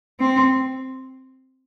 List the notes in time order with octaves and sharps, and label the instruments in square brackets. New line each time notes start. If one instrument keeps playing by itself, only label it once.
[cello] C4